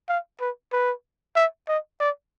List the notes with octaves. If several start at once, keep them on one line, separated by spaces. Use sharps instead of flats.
F5
B4
B4
E5
D#5
D5